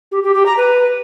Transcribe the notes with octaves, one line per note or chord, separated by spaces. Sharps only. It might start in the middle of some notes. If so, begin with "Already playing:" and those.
G4
G4
G4
A#5
B4